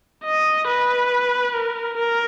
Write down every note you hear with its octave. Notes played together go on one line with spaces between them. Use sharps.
D#5
B4
A#4
A#4